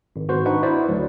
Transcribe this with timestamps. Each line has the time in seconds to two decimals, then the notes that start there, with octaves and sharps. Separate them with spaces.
0.16 G#1
0.29 G#1 F#4 B4 C5
0.45 D4 D#4 B4 F#5 C#6
0.63 E4 C5 D5
0.89 D2 F#3